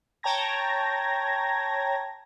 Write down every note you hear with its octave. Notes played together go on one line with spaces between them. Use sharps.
C#5 G5 A5 A#5 G#6 A#6